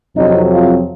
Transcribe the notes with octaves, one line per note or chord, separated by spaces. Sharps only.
F2 C3 F#3 D#4
F4